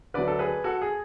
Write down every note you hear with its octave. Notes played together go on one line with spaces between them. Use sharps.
D2 D3 F#3 B4 D5
A4
G#4 B4
F#4 A4
G#4